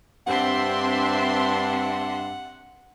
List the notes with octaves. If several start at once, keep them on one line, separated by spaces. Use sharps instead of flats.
G2 C4 D4 E5 F#5 C6